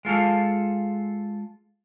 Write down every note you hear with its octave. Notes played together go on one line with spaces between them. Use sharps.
G#3 F4 A4 F5